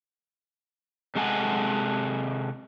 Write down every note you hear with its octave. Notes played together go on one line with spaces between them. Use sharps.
C3 G#3 A4 F#5 G#5